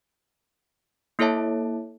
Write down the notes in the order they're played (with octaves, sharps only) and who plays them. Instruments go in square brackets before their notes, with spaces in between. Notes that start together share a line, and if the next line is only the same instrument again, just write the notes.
[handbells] A#3 E4 A4 C#5 E5 A5